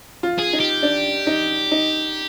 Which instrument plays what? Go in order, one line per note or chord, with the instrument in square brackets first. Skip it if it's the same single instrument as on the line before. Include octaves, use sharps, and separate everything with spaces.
[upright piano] F4
[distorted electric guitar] G#4
[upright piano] D#4
[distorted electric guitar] G4
[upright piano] D4
D#4
D#4